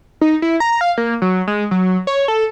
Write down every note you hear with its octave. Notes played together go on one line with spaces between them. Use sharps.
D#4
E4
A#5
F5
A#3
F#3
G#3
F#3
C#5
A4